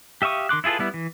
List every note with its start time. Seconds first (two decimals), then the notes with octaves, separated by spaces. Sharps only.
0.22 G4 E5 F5 C#6 D#6
0.49 D#3 C6 D6 F#6
0.64 E4 F4 G#4 A4 B4
0.79 G3 B3 E4
0.94 E3